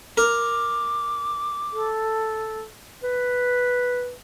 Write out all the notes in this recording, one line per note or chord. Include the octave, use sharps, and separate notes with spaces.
A#4 D6
A4
B4